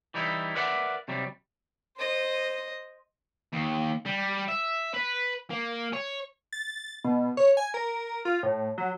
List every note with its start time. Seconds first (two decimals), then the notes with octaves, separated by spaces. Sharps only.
0.14 E3 G3 D#4 E4
0.55 A#4 B4 D5 E5 F#5
1.08 C3 F#3 G3
1.97 C5 D#5
3.53 D#2
4.06 G3
4.49 E5
4.94 B4
5.51 A#3
5.93 C#5
6.53 A6
7.04 B2
7.37 C#5
7.57 G#5
7.74 A#4
8.25 F4
8.43 A2
8.78 F#3